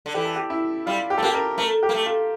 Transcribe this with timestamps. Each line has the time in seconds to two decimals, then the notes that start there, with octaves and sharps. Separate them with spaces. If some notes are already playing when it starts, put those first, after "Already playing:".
0.06 D3
0.14 E3 G4
0.25 A4
0.36 G4
0.50 E4
0.86 G3 F4
1.10 G4
1.18 A3 A4
1.23 A#3 G4
1.34 A#4
1.58 A3 A#4
1.83 G4
1.89 A#3
1.95 A3
2.06 F4